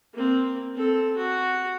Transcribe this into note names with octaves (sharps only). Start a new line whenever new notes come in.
A#3 C4
C4 A4
F#4